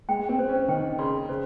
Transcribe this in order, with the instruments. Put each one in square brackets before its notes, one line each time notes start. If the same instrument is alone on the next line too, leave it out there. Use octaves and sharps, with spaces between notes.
[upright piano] G#3 [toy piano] G5
[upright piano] C4
[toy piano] C5
[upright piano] C#4
[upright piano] D#3 [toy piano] G5
[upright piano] C#3 [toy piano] C6
[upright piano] C#3 [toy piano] C5